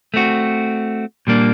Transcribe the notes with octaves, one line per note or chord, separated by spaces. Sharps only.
A3 C4 F#4
A#2 G3 A#3 D4